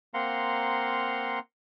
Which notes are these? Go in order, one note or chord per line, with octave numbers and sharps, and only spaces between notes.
A#3 C4 F5 F#5 A#5 C6